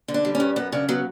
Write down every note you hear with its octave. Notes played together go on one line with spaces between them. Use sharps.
D3
D4
G3
C#4
G2
F#2 B3
C#3 D4
F#3 B3